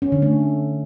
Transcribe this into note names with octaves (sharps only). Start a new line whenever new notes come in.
C#4
D3
A3